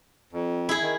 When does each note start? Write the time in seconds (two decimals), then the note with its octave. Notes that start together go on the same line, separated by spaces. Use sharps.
0.33 F2
0.69 E4 G#4
0.82 D#3